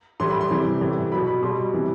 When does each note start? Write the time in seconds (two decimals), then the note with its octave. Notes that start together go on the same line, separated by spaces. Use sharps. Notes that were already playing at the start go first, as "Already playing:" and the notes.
0.20 A2 E3 G3 C6
0.30 B5
0.41 C6
0.51 C3 E3 G3
0.81 A2 E3 G3
1.12 B2 F#3 B5
1.28 B5
1.43 B2 G3 C6
1.73 C3 E3 G3